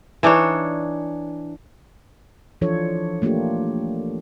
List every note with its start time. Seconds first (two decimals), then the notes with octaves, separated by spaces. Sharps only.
0.23 E3 D4 D#4 C#5
2.61 E3 F3 D4 F4 A4 C#5
3.22 A3 A#3 D4 F4 G4